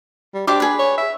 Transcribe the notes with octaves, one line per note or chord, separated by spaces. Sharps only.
G3
D4 G4 C5 D6
G#4 B4
C#5
E5